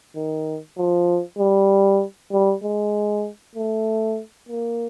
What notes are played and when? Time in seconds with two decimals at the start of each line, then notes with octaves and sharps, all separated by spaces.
0.15 D#3
0.78 F3
1.38 G3
2.32 G3
2.63 G#3
3.55 A3
4.49 A#3